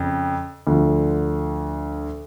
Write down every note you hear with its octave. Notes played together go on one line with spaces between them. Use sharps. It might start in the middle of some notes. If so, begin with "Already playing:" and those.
Already playing: F2 C#3
D2 D3 F3